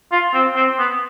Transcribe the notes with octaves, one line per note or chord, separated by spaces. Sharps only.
F4
C4
C4
B3